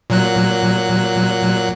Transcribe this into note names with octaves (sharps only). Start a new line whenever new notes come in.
A#2 F#3 F#6